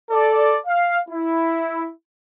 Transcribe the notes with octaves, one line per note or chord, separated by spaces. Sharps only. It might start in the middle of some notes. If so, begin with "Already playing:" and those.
A4 D5
F5
E4